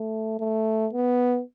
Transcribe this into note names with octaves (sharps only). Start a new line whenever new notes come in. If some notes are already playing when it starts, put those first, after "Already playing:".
Already playing: A3
A3
B3